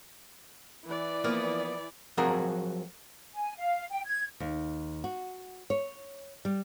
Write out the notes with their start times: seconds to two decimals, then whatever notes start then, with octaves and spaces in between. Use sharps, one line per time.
0.88 E3 D5
1.24 F3 A#3 B3
2.17 F3 F#3 C4 F#4 G#4 A#4
3.34 G#5
3.57 F5
3.91 G5
4.06 G#6
4.40 D#2
5.04 F#4
5.70 C#5
6.45 G3